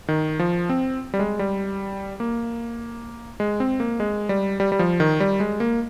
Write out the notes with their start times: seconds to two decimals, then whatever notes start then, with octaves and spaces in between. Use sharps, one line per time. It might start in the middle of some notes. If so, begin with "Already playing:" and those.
0.08 D#3
0.39 F3
0.69 C4
1.14 G3
1.19 G#3
1.39 G3
2.20 A#3
3.40 G#3
3.60 C4
3.80 A#3
4.00 G#3
4.29 G3
4.60 G3
4.72 G3
4.79 F3
5.00 D#3
5.20 G3
5.40 G#3
5.60 A#3